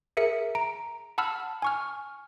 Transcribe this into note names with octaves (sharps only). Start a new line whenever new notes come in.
G#4 A#4 E5 C#7
A#5 D7
F#5 A5 B5 E6 F6
G#5 C#6 F6